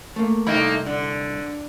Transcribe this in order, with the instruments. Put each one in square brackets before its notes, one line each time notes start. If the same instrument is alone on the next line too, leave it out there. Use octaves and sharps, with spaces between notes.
[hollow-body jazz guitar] A3 A#3
[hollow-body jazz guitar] C2 G5 B5 [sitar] A3 A#3 D#4
[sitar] D3